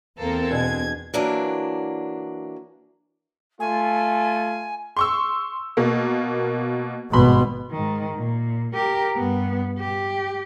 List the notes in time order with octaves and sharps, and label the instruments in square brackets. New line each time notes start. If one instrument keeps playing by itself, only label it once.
[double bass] E2 [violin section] A#3 A4 A#4 [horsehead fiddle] C4
[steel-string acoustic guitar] B2 D4 G#4 [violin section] G#6
[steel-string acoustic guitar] E3 F#3 A#3 D4
[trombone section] A3 F4 [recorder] G#5
[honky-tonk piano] C6 C#6 E6
B2 A#3
[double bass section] G#1 G2 B2 [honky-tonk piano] B5 C6
[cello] G#2 D#3
A#2
G4 A#4
G2 B3
G4